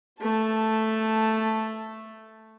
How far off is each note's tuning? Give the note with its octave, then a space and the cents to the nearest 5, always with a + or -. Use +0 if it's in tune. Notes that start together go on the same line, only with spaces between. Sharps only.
A3 +0 A5 +0